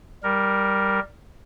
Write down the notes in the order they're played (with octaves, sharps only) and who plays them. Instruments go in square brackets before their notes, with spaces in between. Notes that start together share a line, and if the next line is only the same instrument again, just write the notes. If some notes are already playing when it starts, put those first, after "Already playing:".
[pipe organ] G3 A#4